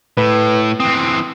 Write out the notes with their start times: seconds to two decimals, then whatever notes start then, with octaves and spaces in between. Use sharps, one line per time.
0.17 A2 B4
0.80 E3 C4 D#6